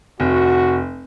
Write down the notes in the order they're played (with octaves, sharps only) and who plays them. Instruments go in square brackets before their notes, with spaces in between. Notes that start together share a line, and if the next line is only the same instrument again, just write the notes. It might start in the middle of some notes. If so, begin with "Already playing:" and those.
[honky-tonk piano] F1 [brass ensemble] F#4